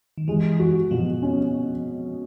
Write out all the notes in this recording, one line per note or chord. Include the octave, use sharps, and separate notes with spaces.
D#3
E3 G#3
F#4
B2 F3
C#4